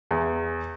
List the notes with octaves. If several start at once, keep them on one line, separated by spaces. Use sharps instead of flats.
E2